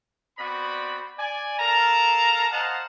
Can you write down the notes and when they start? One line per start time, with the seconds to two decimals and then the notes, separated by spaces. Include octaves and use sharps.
0.38 B3 C4 F#4 D5 B5
1.18 D5 G#5
1.59 A4 A#4 F5 A5 A#5
2.51 C5 D#5 F5 F#5 A5 A#5